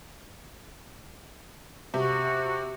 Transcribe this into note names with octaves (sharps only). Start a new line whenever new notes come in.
C3 F#4